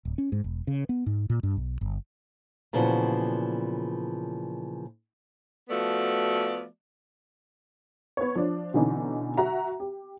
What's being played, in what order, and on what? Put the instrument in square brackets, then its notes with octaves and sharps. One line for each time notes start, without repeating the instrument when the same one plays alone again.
[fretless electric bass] D1
C#4
G#2
E1
C#3
B3
G#2
A#2
G2
B1
G1
[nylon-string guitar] A#2 C#3 E3 F3 B3 F#4
[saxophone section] F3 A3 B3 F#4 D5
[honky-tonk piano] B3 C#5
F3 D4
B2 D3 E3 C#4 D#4
F#4 E5 A#5
G4